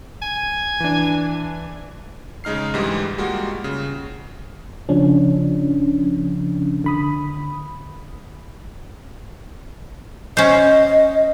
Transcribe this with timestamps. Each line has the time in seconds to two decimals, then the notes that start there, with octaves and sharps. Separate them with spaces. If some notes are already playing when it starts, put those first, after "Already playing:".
0.22 G#5
0.80 E3 D4
2.44 C#3 G#3 D#4 F6 C7
2.74 D2 G#2 E3 G3 G#3
3.18 G3 G#3 A#3 F4 F#4
3.64 C#3
4.89 C#3 F3 C#4 D4
6.84 D3 B5 D#6
10.37 C#4 C5 D#5